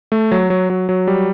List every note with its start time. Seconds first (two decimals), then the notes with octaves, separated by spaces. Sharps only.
0.12 A3
0.31 F#3
0.50 F#3
0.70 F#3
0.89 F#3
1.07 G3